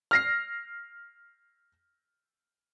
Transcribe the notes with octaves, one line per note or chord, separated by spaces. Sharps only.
F6 A#6 C7